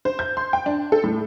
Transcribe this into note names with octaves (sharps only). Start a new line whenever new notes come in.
C5
G6
C6
G5
D4
A4
A2